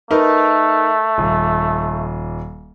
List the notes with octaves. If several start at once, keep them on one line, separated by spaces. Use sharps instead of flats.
A3 D#4 A#4 B4
D#1